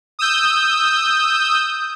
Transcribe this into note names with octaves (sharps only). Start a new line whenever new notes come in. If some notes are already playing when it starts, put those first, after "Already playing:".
D#6 E6 G6